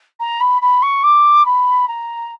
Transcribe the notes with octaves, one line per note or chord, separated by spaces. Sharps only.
A#5
B5
B5
C#6
D6
B5
A#5